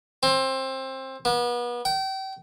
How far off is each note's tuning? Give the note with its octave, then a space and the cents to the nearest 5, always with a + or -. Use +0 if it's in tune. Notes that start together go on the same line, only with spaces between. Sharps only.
C4 +20
B3 -35
G5 -30